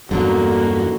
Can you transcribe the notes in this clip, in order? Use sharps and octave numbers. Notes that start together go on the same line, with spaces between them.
E2 G2 D3 F#3 A3 A#3 F#4